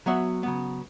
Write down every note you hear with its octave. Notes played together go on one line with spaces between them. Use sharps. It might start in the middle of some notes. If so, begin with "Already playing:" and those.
F#3 B3 F#4 C#5 E5
C#3 F#3 B3